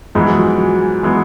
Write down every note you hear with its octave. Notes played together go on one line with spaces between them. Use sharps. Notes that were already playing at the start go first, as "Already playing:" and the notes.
G#2 E3 F3 G#3 B3
F#3
F3
F#3
E3 G#3 B3